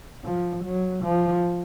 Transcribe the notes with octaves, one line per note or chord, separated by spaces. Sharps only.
F3
F#3
F3